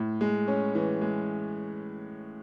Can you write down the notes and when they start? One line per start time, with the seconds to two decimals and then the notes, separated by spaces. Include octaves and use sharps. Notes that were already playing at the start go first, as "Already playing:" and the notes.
Already playing: A2
0.21 G#3
0.48 C#4
0.75 E3
1.01 G#3